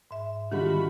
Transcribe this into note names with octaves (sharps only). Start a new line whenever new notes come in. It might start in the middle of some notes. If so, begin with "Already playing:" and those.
G#2 E5
D3 D#3 G3 F4 F#4 B5